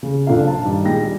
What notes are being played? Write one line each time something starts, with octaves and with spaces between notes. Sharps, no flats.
C#3
F#1 D4 F4 A4 F5
C5 A5
G2 D#3
A#2 G#3 G5 A#6
G3